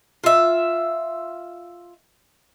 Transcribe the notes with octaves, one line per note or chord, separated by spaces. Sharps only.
F4 E5